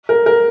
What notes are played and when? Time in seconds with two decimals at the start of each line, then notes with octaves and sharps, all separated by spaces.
0.09 A#4
0.26 A#4